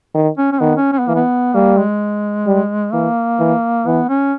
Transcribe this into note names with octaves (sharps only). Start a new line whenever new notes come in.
D#3
C#4
C#4
D#3 B3
C#4
C#4
B3
E3 A#3
B3
G3 A#3
G#3
G3
E3 A#3
E3
E3 B3
C#4